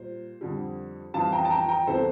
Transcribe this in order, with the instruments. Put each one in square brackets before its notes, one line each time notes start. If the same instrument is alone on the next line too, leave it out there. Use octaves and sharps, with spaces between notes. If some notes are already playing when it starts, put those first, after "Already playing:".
Already playing: [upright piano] A#2 G3 C5
F2 D3 G3
F2 E3 G3 F5 A5
G5 A#5
A5
G5 A#5
G5 A#5
E2 C3 E3 A4 C5